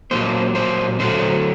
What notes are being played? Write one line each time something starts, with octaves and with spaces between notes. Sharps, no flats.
A#2 F#3 A#3 C5
C5
D3 F#3 A3 C5